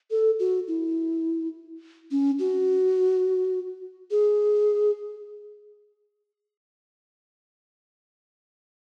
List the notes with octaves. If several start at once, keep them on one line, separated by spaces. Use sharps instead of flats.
A4
F#4
E4
C#4
F#4
G#4